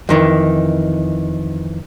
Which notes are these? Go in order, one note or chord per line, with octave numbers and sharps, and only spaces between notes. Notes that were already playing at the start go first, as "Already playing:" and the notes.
F2 D#3 E3